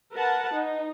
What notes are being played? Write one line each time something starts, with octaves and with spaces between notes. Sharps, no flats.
A#4 B4 F#5 A5
D#4